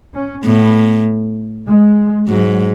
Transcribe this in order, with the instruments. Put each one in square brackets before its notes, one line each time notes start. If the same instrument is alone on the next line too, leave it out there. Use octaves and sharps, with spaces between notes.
[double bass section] C#4
[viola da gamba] A2 [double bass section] B3
[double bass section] G#3
[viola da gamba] G#2 [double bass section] F#3